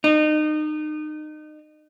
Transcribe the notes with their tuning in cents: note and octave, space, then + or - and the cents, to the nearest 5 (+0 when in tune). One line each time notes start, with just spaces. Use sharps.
D#4 -30